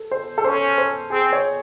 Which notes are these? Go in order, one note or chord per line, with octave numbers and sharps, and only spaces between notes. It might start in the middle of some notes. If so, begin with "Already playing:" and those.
Already playing: A4
C5
A4
C#4 C5
C5
C4 G#4
C#5